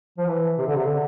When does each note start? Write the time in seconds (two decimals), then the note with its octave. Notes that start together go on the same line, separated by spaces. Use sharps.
0.18 F3
0.28 E3
0.58 C3
0.67 D3
0.76 C3
0.87 D3